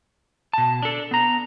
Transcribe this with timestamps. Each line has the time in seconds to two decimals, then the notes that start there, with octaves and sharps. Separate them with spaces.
0.53 B2 A5
0.82 D4 A4
1.11 B3 A#5